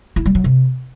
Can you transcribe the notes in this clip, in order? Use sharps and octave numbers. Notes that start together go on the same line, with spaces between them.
E4
G3
F#3
C3